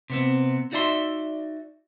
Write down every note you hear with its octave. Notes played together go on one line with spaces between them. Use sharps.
C3 B3 C4
D#4 F#4 D5 E5 A5 C6